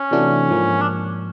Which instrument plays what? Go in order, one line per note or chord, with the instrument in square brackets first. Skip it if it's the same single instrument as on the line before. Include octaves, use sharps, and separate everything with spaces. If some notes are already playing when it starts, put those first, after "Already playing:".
Already playing: [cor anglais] C#4
[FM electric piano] C3 E3 A3 D4 F#4
G#2 F3 A#3
[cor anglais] D4